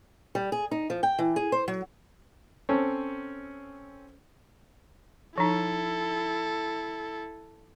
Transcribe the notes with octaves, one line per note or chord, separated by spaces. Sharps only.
G3
G#4
D#4
F3
G5
E3
G#4
C5
F#3
C4 C#4 A4 C#5
F3 D#4 E4 A4